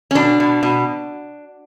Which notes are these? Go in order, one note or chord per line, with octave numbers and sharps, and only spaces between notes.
C#4
B2 D4
B2
B2